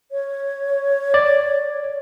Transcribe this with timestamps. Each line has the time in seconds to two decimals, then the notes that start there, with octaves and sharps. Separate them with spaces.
0.12 C#5
1.14 D5